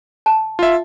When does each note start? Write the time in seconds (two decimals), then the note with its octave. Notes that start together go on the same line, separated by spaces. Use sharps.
0.26 A5
0.59 F4 E5